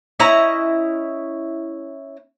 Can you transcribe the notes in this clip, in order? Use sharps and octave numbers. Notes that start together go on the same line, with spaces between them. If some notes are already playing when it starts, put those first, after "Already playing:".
C#4 E4 D#5 A#5